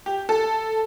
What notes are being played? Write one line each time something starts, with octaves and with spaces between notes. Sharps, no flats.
G4
A4